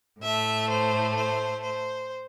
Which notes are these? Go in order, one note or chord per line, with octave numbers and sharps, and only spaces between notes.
A2 A3 E5
C5
C5
C5